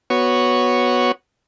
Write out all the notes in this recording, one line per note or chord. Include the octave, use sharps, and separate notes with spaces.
B3 F#4 C#5